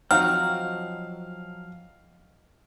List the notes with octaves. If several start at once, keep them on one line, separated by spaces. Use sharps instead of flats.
F3 F#3 C4 D#4 F#4 F5 F6